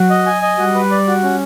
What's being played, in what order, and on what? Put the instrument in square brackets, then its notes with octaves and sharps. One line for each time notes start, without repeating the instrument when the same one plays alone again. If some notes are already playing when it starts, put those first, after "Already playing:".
Already playing: [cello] F#3 [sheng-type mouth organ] F#4
[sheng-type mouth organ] D#5
G#5
D#5
[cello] G3 [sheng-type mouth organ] F#4
[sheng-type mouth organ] B4
D5
F#4
C#4